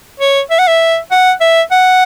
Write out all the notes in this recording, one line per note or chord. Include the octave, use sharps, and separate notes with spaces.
C#5
E5
F#5
E5
F#5
E5
F#5